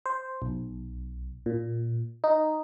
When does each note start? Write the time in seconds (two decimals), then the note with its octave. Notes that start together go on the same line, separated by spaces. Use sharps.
0.06 C5
0.42 B1
1.46 A#2
2.24 D#4